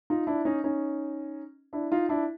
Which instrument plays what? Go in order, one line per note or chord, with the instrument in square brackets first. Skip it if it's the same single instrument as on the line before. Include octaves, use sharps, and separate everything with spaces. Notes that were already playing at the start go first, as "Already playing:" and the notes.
[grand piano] D#4 F4
D4 E4
C#4 D#4
C#4 D#4
D4 E4
D#4 F4
D4 E4